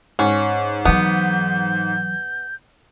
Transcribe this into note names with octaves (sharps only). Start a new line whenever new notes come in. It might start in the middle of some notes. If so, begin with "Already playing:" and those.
G#2 C#4
E3 F#3 B3 G6